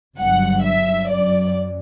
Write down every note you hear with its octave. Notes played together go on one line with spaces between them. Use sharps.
G1 G2 F#3 F#5
E5
F#2 F#3 D5